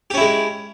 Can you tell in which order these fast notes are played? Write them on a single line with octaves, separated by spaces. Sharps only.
G4 C#4 E4 G#3